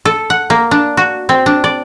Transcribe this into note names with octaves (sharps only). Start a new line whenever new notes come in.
A4
F#5
A#3
D4
F#4
C4
D4
D5